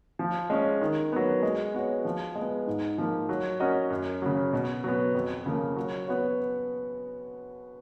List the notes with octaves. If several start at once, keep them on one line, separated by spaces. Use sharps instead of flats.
F3
G#3 C#4
D#3
F#3 B3
G#3
B3 F#4 C#5
F3
G#3
B3
G#2
F3 A#3
F#3
C#4 F#4 A#4 D#5
F#2
C#3 F#3
B2
F#3 B3
F2
C#3 F3 A#3
F#3
B3 F#4 C#5